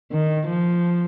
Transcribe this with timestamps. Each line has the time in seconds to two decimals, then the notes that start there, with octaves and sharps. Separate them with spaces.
0.12 D#3
0.47 F3